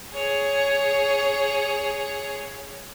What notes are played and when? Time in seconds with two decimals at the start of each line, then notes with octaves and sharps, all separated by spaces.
0.14 G#4 C#5